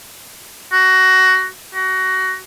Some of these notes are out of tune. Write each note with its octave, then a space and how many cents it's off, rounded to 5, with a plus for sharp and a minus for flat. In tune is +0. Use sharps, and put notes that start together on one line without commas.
F#4 +15
F#4 +25